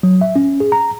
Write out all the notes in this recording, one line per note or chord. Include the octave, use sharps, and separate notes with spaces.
F#3
E5
C#4
G#4
A#5